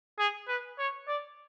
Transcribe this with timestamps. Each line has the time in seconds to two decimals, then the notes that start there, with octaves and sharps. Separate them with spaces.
0.19 G#4
0.48 B4
0.78 C#5
1.07 D5